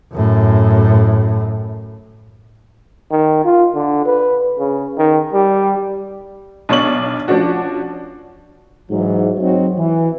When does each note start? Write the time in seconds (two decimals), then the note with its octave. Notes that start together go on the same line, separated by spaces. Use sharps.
0.13 F#2 A2
3.11 D#3
3.45 F4
3.75 D3
4.06 B4
4.59 C#3
4.98 D#3
5.33 G3
6.69 B1 D4 C#5 C#6 F#7
7.28 F3 C#4 D4 F#4
8.91 G#2 E3 F#3
9.38 F#3 C4 D#4 F#4 C#5
9.78 E3